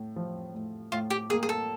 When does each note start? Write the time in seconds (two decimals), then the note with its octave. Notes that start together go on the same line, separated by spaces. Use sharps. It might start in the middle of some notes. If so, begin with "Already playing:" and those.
Already playing: A2
0.16 F3
0.54 A2
0.92 A2 F4
1.10 G4
1.30 A#3 G#4
1.43 G#4
1.49 A4